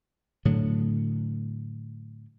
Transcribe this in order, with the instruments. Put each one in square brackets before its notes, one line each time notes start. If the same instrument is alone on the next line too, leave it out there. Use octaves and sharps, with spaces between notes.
[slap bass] A2 D3 F#3